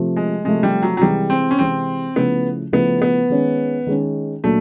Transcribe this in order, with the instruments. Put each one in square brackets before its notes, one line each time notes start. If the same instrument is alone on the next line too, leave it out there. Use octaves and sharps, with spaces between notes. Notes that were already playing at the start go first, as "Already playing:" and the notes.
Already playing: [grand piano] C3 F3 A3
[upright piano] G#3
[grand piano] C3 F3 A3 [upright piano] G#3
[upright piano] G3
F#3
F#3
[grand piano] C3 E3 G#3 [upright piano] G3
[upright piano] C4
C#4
[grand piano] C3 E3 G#3 [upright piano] C4
[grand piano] C#3 F3 A3 C#4 E4 [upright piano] B3
[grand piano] C#3 F3 A3 C#4 E4 [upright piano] B3
[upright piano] B3
[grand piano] D#3 G#3 C#4
D#3 G#3 C#4
[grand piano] A#2 F#3 A#3 D4 [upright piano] A3